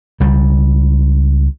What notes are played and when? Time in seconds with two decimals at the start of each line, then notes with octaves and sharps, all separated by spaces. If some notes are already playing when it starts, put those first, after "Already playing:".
0.20 C#2 G3